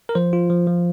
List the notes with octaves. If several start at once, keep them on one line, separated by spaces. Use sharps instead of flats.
A#4
F3 C5
F4
F3
F3